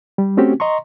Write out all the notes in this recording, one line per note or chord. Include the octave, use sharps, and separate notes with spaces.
G3
A3 C4 C#4 F#4 G4
D#5 A#5 C6 C#6